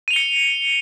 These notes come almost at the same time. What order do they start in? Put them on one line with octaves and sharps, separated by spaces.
D#7 F7 G7 C#7